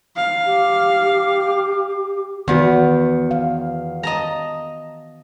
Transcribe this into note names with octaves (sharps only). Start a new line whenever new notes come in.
F5
G4
E2 D#3 B3 F#4
F5
D#5 A5 A#5